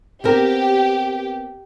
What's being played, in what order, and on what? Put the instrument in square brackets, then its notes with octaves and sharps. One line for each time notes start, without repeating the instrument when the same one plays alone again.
[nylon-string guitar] B3 C4 A#4 [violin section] G4